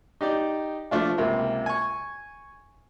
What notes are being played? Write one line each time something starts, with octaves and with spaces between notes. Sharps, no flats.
D#4 G4 D5
F3 A3 D4 F4
C#2 C3 A#3
G#5 C#6